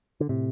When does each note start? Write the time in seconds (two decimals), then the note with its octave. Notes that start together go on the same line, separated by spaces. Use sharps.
0.20 D3
0.29 A2 C3